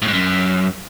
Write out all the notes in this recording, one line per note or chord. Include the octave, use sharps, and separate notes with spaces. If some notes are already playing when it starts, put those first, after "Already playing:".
A2
G#2
F#2